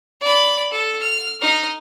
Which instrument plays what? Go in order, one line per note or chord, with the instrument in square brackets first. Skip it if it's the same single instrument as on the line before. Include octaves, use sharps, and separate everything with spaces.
[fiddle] D5 B5
A4
F6
D#4 F6